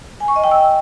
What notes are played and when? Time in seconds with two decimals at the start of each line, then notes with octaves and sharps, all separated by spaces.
0.20 G#5
0.28 C#6
0.36 D#5
0.44 G5
0.51 E6